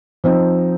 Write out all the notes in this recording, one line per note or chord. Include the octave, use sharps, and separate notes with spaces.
F3 C4 D#4